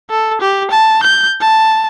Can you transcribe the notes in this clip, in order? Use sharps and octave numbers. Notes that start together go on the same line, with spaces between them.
A4
G4
A5
G6
A5